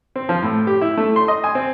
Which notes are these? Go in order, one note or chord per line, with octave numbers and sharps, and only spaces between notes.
C4
F3
A2
G4
E4
A3
C6
D#5
G#5
C4